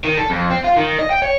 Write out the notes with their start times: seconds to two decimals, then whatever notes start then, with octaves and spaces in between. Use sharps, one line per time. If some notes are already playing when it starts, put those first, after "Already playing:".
0.05 D#3
0.17 A4
0.30 F2
0.50 C4
0.64 F4
0.76 D#3
0.99 D#5
1.11 G5
1.22 C#5